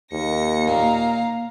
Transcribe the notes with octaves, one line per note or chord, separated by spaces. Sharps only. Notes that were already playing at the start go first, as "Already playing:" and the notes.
D#2 A#3 A#6 C#7
A#2 F5 A#5